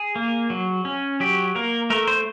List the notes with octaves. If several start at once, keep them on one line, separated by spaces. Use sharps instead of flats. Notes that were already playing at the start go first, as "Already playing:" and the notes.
Already playing: G#4
A#3
F#3
C#4
F#3 G4
A#3 A#4
A3 A#4
C5